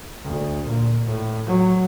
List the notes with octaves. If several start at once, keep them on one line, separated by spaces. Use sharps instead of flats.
D2
A#2
A2
F#3